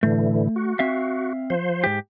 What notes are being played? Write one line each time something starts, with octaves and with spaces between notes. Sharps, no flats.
A2 D3 E3 A3
F#4
C4 E5 F5
F3 C5
G#2 G4